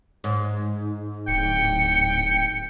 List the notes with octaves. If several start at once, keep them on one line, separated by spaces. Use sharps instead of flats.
G#2
D1 G5 C#7